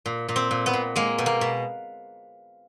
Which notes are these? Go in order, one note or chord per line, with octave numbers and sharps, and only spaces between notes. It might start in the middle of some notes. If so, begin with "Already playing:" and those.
A#2
A#2
C4
A#2
B3
A#2
G#3 A#3
B2
A#3
B2